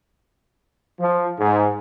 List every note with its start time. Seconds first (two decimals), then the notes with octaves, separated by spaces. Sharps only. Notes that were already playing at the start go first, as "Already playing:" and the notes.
1.00 F3
1.39 G#2